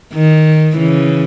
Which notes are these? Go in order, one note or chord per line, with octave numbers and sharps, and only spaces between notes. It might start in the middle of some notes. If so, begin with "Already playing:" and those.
D#3
C#3 E3